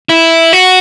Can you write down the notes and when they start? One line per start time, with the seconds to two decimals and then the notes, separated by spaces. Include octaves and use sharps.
0.09 E4
0.53 F#4